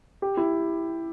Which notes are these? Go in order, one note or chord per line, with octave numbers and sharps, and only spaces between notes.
G4
E4